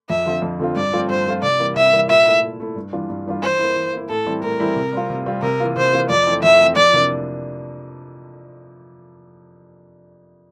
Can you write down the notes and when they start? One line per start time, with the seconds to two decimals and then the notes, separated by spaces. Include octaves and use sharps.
0.09 F2 E5
0.26 D3 F3 C4 F4
0.42 F2
0.60 D3 F3 C4 F4
0.76 G2 D5
0.93 F3 A3 C4 F4
1.09 G2 C5
1.26 F3 A3 C4 F4
1.43 C3 D5
1.60 E3 G3 A#3
1.76 C3 E5
1.93 E3 G3 A#3
2.10 A#2 E5
2.26 A3 E4
2.42 A#2
2.60 A3 E4
2.76 G2
2.93 E3 G3 D4 F4
3.10 G2
3.26 E3 G3 D4 F4
3.43 E3 C5
3.59 A#3 E4
3.76 E3
3.93 A#3 E4
4.09 A2 A4
4.26 E3 G3 C4 E4
4.43 A2 A#4
4.60 E3 G3 C4 E4
4.76 C3
4.93 G3 C4 F4
5.10 C3
5.26 G3 C4 F4
5.42 C3 A#4
5.60 E3 A#3 F4
5.76 C3 C5
5.93 E3 A#3 F4
6.10 F2 D5
6.27 E3 A3 C4
6.43 F2 E5
6.60 E3 A3 C4
6.76 F2 D5
6.93 C3 E3 A#3 D4